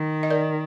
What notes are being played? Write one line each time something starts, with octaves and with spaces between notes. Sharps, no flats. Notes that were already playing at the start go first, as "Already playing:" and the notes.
Already playing: D#3
D#5
A#4 D5